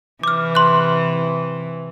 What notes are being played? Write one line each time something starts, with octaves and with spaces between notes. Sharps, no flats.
C3 E3 D6 F6
C6 F#6